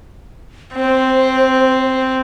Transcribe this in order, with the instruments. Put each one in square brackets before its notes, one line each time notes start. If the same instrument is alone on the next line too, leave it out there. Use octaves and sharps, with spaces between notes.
[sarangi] C4 [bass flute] C5